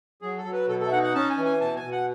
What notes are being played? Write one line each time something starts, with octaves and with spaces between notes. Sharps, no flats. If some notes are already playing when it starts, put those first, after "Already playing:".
F#3 G#4
A4
F#3
B4
B2 A4
A4
E5
D#4 F#5
F#5
C#4 A5
G#5
E3
G#5
B2 A5
G#5
B2
F#5